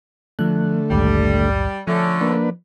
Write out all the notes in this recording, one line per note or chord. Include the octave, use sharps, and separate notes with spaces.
D3 F3 A3 F#6
A#1 D#2 G#2 G3
D3 F3 A3 C#4
A#3 D4 B4